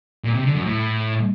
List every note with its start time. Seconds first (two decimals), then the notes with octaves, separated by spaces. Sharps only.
0.24 A#2
0.34 C3
0.45 D3
0.55 F#2
0.65 A2